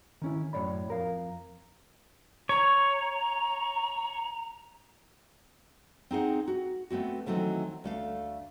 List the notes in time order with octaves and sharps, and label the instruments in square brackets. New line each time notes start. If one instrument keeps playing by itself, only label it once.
[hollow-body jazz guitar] D#3 C#4 E4
F#2 A2 C#5 D5 B5
F2 A#4 F5
[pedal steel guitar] C#5 [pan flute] A#5
[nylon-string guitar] C4 D#4 G#4 F#5
F#4
A3 B3 C4 F#4
D#3 E3 F#3 A3 C4
D2 A3 F5